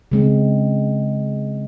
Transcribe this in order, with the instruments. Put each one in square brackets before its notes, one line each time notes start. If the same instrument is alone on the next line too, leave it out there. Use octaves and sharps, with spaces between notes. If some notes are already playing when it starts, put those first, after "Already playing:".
[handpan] C#3 G#3 C4